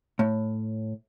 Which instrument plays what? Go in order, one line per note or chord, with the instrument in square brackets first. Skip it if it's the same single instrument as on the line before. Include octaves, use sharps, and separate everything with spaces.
[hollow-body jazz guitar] A2